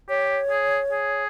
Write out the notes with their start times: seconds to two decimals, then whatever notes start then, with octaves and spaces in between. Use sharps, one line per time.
0.09 G4 C#5
0.50 G#4
0.92 G#4